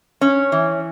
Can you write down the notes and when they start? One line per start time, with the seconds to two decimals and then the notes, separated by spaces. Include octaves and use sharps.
0.21 C#4
0.52 E3